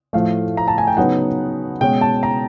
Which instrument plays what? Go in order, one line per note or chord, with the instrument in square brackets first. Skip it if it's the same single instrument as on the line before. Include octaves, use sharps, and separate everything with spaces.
[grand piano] A2 F3 A3 F5
A#5
A5
G#5
G5
C#3 F#3 B3 D#4 F#5
B2 G#3 C#4 G5
A5
A#5